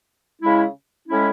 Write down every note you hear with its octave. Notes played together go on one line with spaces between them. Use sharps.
C#3 G#3 C#4 E4
A2 G#3 C#4 E4